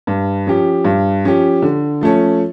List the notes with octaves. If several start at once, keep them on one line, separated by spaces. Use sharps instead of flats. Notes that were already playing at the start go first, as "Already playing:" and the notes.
G2
F3 C#4 G4
G2
F3 C#4 G4
D3
F3 A3 C#4